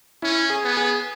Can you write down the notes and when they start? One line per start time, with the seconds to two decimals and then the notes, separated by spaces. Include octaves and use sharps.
0.22 C#4 E4
0.50 G#4
0.64 B3
0.77 G#4